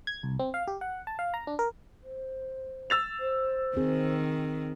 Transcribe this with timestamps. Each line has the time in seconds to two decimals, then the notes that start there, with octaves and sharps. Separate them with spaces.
0.07 G#6
0.23 C2
0.39 C4
0.54 F5
0.68 G4
0.81 F#5
1.07 A5
1.19 F5
1.34 A#5
1.47 D4
1.59 A#4
2.03 C5
2.90 E6 A6 F7
3.20 C5
3.77 D#3 C4 G#4